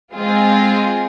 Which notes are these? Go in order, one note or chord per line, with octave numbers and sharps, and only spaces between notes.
G#3 C4 F4 G#4